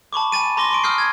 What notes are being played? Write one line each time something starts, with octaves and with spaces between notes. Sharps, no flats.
A5 B5 C#6 D6
G#5 B5 A6 D#7
A#5 C6 D6 A#6 G7
C6 C#6 D7
D#6 F6 G6 C7
G#6